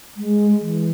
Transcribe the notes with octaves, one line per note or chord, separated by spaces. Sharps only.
G#3
E3